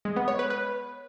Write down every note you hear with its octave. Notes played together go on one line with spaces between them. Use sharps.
G#3
B3
C#5
B4
B4